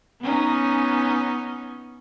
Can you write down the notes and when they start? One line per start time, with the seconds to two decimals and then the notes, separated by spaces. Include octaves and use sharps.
0.21 B3 C#4 D#4